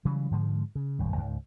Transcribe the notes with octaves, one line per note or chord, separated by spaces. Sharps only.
C#3 E3 F#3 G3
G#2 D3 F3 G#3
C#3
D#1 G#1 G2
C#2 G#2